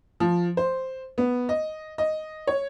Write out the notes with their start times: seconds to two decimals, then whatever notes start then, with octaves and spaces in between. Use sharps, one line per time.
0.20 F3
0.57 C5
1.18 B3
1.49 D#5
1.98 D#5
2.47 C#5